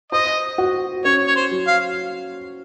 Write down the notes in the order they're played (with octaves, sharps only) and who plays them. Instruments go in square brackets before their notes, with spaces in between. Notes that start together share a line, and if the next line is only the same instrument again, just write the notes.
[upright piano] C5 [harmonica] D#5
[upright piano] F#4
[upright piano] C#4 [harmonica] C#5
[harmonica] C#5
C5
[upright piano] F#3
[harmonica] F5